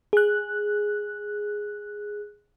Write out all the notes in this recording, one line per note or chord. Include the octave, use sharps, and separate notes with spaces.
G#4 F#6